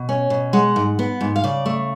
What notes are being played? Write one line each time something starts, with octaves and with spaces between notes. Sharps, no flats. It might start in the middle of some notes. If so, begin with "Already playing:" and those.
Already playing: B2
C#4
B2
G#3 F#5
G#2
B3
G#2
F5
C#3 D5
A3